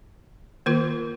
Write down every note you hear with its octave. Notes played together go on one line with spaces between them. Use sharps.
D#3 A#3 F4 A#4